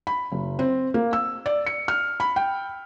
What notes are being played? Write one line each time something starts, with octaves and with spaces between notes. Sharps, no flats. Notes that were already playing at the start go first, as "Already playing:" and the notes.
B5
F#1
C4
A#3
E6
D5
C#7
F6
B5
G5